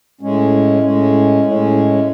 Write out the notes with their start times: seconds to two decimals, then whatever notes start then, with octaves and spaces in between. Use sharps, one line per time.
0.21 A2 G#3 C#4
0.82 A2 G#3 C#4
1.42 A2 G#3 C#4